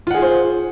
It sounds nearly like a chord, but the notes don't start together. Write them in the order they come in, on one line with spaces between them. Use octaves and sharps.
F4 F#5 G#4 G#5 C5